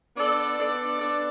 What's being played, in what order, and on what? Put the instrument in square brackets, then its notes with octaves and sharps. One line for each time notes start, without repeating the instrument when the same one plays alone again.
[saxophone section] B3 D4 A4 D5
B3 D4 A4 D5
B3 D4 A4 D5